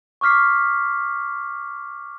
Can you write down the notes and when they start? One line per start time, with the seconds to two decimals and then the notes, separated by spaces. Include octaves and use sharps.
0.21 C#6 D6 F6 B6 C7